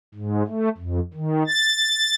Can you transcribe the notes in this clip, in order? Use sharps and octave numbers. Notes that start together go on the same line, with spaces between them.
G#2
A3
F2
D#3
A6